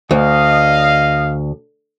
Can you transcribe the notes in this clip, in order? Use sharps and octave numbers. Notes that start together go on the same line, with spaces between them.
D2 D#5 F5